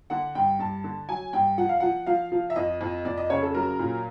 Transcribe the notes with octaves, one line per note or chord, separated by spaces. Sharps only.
D3 F#5
G2 G5
G2 A5
D3
F#3 G#5
G2 G5
F3 F#5
F5
F3 F#5
F3 F5
F3
E5
F2 D#5
F2
F2 D5
D#5
C#3 C#5
A4
F#3 A#4
A#2